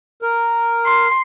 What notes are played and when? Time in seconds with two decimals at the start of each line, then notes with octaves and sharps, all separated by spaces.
0.22 A#4
0.86 C6